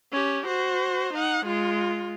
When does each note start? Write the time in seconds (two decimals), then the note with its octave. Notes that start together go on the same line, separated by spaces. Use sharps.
0.12 C#4 G4
0.47 F#4 C5
1.14 D#4 F#5
1.46 G#3 F4